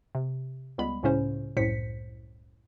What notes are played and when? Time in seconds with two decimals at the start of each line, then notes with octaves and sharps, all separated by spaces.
0.15 C3
0.78 C#2 G3 G#3 B3 B5
1.03 C#2 A2 C#3 C#4 C5
1.57 C2 F#2 A2 C5 B6 C#7